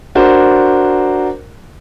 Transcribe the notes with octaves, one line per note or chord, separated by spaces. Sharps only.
D4 F#4 A#4 C5